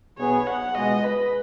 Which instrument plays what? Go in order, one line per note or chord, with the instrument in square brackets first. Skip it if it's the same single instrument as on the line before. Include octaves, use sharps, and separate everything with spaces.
[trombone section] B1 B2 B3 G#4 [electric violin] C#5
[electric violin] F#5
[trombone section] C#2 B2 G#3 [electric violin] D#5
[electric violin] B4